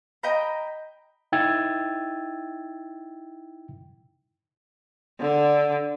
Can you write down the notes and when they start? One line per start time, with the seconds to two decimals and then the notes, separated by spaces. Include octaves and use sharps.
0.23 D#5 G5 A#5 B5
1.32 D#4 E4 G5 E6 G#6 A6
5.20 D3